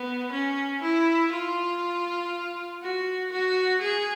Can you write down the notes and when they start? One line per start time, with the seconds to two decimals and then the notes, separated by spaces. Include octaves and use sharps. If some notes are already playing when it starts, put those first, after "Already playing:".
Already playing: B3
0.32 C#4
0.82 E4
1.32 F4
2.82 F#4
3.32 F#4
3.81 G#4